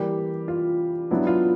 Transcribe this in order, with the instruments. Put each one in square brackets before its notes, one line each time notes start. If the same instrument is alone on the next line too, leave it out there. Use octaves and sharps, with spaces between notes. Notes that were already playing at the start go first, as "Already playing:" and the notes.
Already playing: [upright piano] E3 G3 A#3 G4
F4
F#3 B3 D4 E4
F4